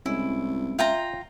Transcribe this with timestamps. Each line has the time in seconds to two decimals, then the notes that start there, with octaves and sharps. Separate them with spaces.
0.06 C2 G#3 C#4 E4
0.79 F4 E5 G5 A#5